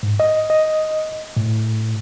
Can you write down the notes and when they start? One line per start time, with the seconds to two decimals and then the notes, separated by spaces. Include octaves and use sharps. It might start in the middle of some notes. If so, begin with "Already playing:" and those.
0.03 G#2
0.20 D#5
0.50 D#5
1.37 A2